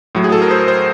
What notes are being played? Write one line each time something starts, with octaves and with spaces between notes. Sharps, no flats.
A2 F#3
G#4
A4
A#4
C5
C5